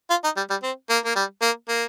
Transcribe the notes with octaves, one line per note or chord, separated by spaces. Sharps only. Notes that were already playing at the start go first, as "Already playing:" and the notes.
F4
D#4
G3
G3
C4
A#3
A#3
G3
A#3
A#3